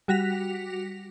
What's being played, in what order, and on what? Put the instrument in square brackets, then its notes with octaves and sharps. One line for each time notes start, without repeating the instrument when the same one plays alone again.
[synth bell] G3 F#4 A#6 B6 F7